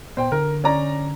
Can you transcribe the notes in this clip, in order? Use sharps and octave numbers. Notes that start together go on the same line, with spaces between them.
A#2 B3 C5 G5
D3 A#4
C#4 D5 A#5